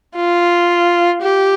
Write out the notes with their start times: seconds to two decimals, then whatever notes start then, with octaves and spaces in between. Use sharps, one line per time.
0.16 F4
1.23 G4